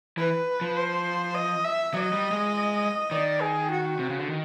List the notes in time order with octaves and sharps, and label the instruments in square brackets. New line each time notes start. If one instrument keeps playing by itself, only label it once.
[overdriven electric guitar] E3 [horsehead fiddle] B4
[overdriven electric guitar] F3
[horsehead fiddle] C5
D#5
E5
[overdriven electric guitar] F#3 [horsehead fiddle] D#5
[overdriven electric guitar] G3
G#3
[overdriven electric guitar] D#3 [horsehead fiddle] D5
[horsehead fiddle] G#4
F#4
[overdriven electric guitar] C3
C#3
D3
D#3